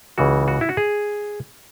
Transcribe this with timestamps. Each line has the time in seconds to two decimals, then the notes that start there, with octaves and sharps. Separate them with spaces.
0.18 C#2 C#3 E3 F#4
0.48 F#4
0.61 E4
0.69 F#4
0.77 G#4